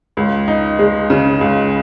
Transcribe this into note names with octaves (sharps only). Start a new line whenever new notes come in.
C#2
D#4
G#3
C#3
C#2